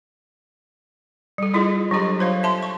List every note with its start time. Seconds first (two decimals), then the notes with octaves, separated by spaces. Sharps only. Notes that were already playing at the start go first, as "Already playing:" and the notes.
1.38 G3 A4
1.53 G3 E4 F4 G#4 A4 D#5
1.91 F#3 G3 D4 G4 A4 D#5
2.19 F4 C5 C#5 F5
2.43 E5 A5 C6
2.63 C#6